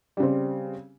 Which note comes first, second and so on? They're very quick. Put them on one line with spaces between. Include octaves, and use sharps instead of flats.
G3 C#3 C4